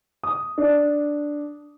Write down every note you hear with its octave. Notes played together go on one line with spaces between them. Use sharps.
D#6
D4